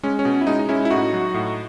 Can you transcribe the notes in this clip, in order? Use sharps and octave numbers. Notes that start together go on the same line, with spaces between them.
G#3 C#4
C#4
B2
E4
G#3 D#4
D#4
G#3 C#4 E4
E4
A2 D#4 F#4
F#3
A2